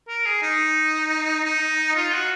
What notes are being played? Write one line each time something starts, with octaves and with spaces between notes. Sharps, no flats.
A#4
G#4
D#4
D#4
F4
F#4